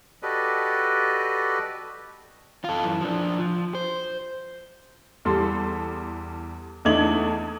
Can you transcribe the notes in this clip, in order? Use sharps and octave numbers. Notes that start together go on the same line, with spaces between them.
F#4 G4 A4 B4 D5 D#5
F4 A4
F#2 E3
F3 D4
F3
C5
E2 G3 A4 C6
E2 A3 D4 D#4 G#6 F#7